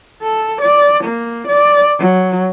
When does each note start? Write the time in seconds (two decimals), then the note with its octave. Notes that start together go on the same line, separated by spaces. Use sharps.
0.22 A4
0.62 D5
1.04 A#3
1.48 D5
1.99 F#3